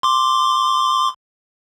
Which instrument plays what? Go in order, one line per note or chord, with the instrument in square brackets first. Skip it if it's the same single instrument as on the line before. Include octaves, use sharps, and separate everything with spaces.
[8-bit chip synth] C6 D6